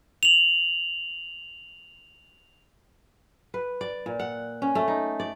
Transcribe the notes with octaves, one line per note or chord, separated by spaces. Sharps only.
F7 F#7
B4
D5
A#2
F#5
C#4
A3
D#4
D5